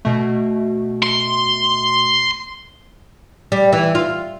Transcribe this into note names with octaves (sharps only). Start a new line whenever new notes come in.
B2 A3
C6
G3
E3
F4